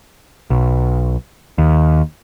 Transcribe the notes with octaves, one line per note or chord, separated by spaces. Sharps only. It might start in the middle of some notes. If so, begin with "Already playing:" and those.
B1
D#2